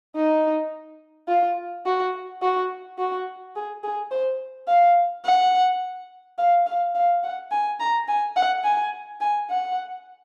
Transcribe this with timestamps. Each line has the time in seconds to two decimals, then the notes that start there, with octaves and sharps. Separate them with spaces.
0.16 D#4
1.28 F4
1.86 F#4
2.42 F#4
2.99 F#4
3.56 G#4
3.83 G#4
4.11 C5
4.68 F5
5.25 F#5
6.38 F5
6.66 F5
6.95 F5
7.24 F#5
7.51 G#5
7.80 A#5
8.08 G#5
8.36 F#5
8.64 G#5
9.21 G#5
9.50 F#5